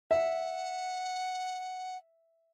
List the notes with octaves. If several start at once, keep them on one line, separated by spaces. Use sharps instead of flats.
E5 F#5